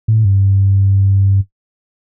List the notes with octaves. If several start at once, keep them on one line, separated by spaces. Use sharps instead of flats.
A2
G2